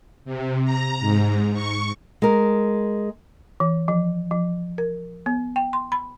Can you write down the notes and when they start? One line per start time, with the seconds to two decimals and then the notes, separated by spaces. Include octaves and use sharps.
0.25 C3
0.64 A#5
1.00 G#2
1.53 C#6
2.22 G#3 A#4
3.60 E3
3.88 F3
4.31 F3
4.78 A#4
5.26 B3
5.56 G5
5.73 C6
5.92 B5